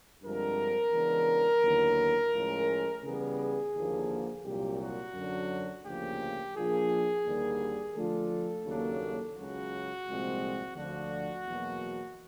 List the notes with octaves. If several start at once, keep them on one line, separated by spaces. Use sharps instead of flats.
G2 D3 F3 G#3 C4 A#4
C#3 E3 G#3 B3 D4
D#2 D3 F#3 B3 E4
A2 F3 G#3 C#4
C#3 E3 G3 B3 G#4
D#2 D3 F3 A#3
C2 A#2 F#3 G4
F#4
F#2 D3 F#3
D2 C#3 F3 A#3 G4
A#2 F3 A#3 D4 F4 G#4
D#2 D3 G3 A#3
D3 F3 A3 D4 F4 A4
D#2 C#3 F#3 A#3 D4
C#2 C#3 F#3 F#4
C2 A#2 F3 G#3 C4
D2 D3 F3 F#4
E2 B2 F#3 A#3